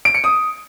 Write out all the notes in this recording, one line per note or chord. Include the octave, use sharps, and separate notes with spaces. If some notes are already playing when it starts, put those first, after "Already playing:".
D7
C#7
D#6